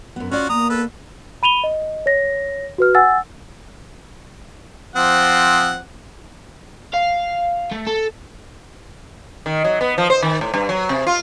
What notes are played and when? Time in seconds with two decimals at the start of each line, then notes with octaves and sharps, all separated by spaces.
0.16 F#2 B3
0.32 C#4 F4 F#4 D5
0.49 A#3 B3 A#5 D#6
0.70 A4 B4
1.43 B5 D#7 F7 G7
1.64 D#5
2.06 C#5 A#6
2.78 F#4 B4 F6
2.95 F#5 G#5 E6 A6
4.96 F3 C4 F#5
6.94 F5
7.72 A3
7.87 A4
9.46 D#3
9.64 F#3
9.81 B3
9.98 F3
10.10 C5
10.22 D#3
10.41 A2
10.54 G2
10.69 F#3
10.89 C3
11.07 F4